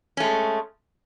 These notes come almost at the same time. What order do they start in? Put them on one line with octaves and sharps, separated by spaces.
C#4 A3 G#3